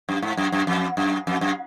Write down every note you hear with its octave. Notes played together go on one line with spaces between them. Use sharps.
F#2
G#2
F#2
F#2
F2
F#2
F2
F#2